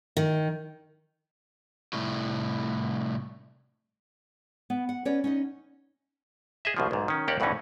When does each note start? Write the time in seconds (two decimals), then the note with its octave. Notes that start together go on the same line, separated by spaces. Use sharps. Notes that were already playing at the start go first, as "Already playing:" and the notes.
0.17 D#3
1.93 C2 A2
4.70 B3
4.89 F#5
5.05 C#4 B4 C#5 D5
5.24 C#4 D#4 D#5
6.65 G#4 D#5 E5
6.77 C2 B2 F3
6.91 B1 G#2
7.08 D#3 C#4
7.28 D#2 A#3 G4 D5 F#5
7.40 D2 G2 B2 E3 C#4 D#4